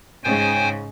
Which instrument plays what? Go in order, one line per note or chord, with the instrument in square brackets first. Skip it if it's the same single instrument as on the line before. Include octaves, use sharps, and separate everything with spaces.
[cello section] G#2 C#3 [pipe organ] C5 G5 G#5